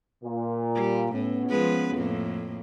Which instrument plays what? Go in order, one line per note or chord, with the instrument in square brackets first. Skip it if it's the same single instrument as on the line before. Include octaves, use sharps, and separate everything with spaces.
[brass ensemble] A#2
[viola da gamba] G3
[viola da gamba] A2 [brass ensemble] B3 C#4
[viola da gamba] F3 G#3 B4
F2 A2 A#3